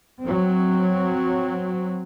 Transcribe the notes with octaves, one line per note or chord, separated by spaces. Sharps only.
F#3 C4